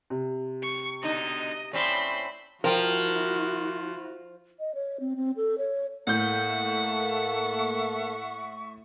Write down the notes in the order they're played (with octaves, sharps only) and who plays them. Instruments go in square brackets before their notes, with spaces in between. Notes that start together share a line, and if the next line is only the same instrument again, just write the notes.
[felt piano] C3
[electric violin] C#6
[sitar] B2 D3 D#4 [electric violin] D#5
[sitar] A2 C4 C#4 [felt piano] D5 [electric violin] B5 C6
[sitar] F3 [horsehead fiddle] E4 F#4 [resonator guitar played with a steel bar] A#4 G5
[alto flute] D#5
C#5
C4
C4
A4
C#5
[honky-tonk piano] A2 G6 [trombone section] A#3 A4 [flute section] E5 C#6 [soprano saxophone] F#5